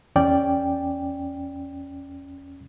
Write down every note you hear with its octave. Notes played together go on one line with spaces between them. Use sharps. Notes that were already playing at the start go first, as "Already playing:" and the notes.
E2 C#4 D5 G5